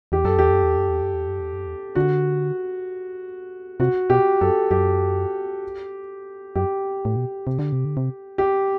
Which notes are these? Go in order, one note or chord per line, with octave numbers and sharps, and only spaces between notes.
E2 G4
F#2 A4
E2 G4
F#2
E2
F#2
E2
F#2
E2
F#2
E2
F#2
E2
D3 F#4
C3 F#4
B2 G4
F#2 A4
F#2 G4
F#2 G4
A2
B2
C3
D3
C3
D3
C3
G4